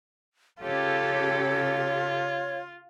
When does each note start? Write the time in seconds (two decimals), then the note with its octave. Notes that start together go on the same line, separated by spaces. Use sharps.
0.61 C#3 F4 G4 A4 C#5
1.48 F4